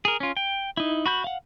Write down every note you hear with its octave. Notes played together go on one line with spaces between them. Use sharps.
G#4 A#4
C#4 F4
G5
D#4 E4
F#4 B5 G6
F5 F#5